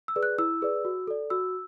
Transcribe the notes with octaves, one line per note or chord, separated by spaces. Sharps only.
E6
G#4 B4 D5
F#6
E4 E6
G#4 B4 D5
F#4
A4 D5
F#4 E6